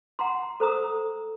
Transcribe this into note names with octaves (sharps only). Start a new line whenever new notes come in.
F#5 A#5 C6
A4 C5 A#5 D#6 E6